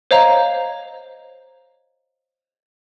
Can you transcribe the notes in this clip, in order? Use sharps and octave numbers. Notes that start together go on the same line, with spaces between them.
C5 C#5 D#5 F5 A#5